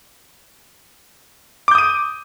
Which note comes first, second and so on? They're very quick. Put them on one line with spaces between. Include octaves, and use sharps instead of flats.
D6 G6 D#6 D#7